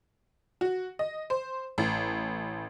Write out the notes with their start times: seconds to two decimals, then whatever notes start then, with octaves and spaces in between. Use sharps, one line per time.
0.61 F#4
0.99 D#5
1.30 C5
1.78 A1